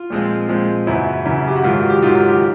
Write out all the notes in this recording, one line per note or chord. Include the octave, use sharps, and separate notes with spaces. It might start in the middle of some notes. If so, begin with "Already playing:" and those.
Already playing: F4
A#2 F3 G#3 C4
A#2 F3 G#3 C4
F#2 C#3 E3 E4
F#2 C#3 E3
G4
F#4
G#2 D#3 F#3 F4
F#4
G4
G#2 D#3 F#3 F4
F4
G4